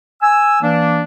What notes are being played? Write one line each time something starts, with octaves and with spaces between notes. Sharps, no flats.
G#5 E6
E3 A#3 D4